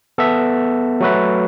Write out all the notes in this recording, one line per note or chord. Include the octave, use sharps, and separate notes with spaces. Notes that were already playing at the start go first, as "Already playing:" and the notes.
B3 A4 E5
F#3 A3 F#4 B4 E5